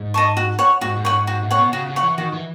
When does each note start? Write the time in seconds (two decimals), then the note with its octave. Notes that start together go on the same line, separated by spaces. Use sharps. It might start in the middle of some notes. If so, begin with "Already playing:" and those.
Already playing: G#2
0.14 D#5 A5 C#6
0.37 F#4
0.59 C#5 F#5
0.81 G#2 F#4
0.97 G#2
1.05 C#5 F#5
1.13 G#2
1.27 G#2 F#4
1.43 A2
1.51 C#5 F#5
1.58 B2
1.73 C#3 F#4
1.89 C#3
1.96 C#5 F#5
2.03 E3
2.18 D#3 F#4
2.33 E3